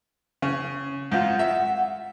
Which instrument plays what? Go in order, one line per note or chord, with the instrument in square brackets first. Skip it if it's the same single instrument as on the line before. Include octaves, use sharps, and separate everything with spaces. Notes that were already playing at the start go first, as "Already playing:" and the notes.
[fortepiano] C#3
[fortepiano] G#2 F4 [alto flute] F#5
[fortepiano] E5